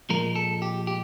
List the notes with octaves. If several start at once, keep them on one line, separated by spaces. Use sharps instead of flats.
A#2 F3 G#3 A#4
A4
G4
G4